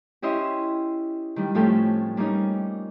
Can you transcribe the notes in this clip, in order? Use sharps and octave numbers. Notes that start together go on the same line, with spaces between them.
C#4 E4 G4 D#5 E5 C6
D#3 G3
A2 F3 C4 C#4 G4 A4
G3 A#3 C#4 D#4